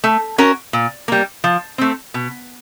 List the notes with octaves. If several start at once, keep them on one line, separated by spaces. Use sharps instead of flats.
A3
C#4 F#4 A#4
A#2
G3 A#3
F3
A3 C4
B2